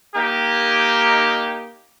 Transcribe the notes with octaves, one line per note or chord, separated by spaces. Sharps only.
A#3 D#4 G4